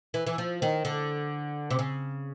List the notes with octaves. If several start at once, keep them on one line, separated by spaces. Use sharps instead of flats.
E3
E3
F3
D#3
D3
C3
C#3